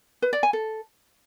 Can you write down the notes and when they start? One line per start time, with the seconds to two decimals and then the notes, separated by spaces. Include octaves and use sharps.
0.22 B4
0.33 D5
0.43 G#5
0.53 A4